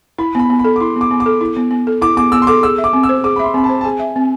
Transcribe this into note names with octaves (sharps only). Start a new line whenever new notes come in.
E4 B5
B3 B5
B3
B5
A4
D6
E4 C6
B3
D6
B3
D6
A4
E4
B3
B3
A4
E4 D6
B3 D6
B3 E6
C6
A4 D6
G#4 E6
E5
D6
C4
E6
C5
G#4 D6
B5
E5 C6
C4 B5
A5
C5
A5
G#4 G#5
E5
C4